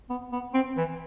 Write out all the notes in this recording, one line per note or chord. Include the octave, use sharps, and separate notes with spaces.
B3
B3
C4
E3